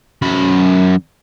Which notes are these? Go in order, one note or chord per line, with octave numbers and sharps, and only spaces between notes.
F#2 B5